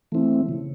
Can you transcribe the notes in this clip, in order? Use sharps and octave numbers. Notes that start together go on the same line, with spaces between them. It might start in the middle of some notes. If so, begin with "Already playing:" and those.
E3 A3 C4 E4
C#3